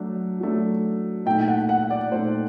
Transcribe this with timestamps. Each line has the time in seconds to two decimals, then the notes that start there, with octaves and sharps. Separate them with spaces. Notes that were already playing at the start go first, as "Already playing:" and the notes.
Already playing: F#3 A3 D4
0.40 F#3 A3 D4
1.26 A#2 A3 D#4 G5
1.48 F#5
1.69 F#5
1.91 D5
2.12 A#2 A3 D#4 C5